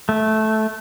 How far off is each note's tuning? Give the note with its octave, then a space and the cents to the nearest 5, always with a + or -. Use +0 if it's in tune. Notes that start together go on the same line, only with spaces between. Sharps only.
A3 -10